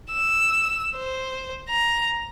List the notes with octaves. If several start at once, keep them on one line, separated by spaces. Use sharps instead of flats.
E6
C5
A#5